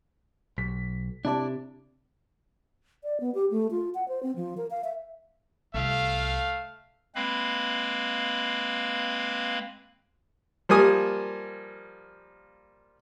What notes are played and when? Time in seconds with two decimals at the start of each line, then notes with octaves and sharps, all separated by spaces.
0.58 B1 B6
1.25 C3 D4 E4 D5 A5
3.04 D5
3.20 B3
3.35 G4
3.51 A3
3.71 F4
3.95 F#5
4.08 C5
4.23 C4
4.36 F3
4.57 A#4
4.71 F5
4.84 E5
5.74 C2 A3 F5
7.15 G#3 A#3 C4 B4 F5 B5
10.69 F3 G3 A#3 G#5 D#6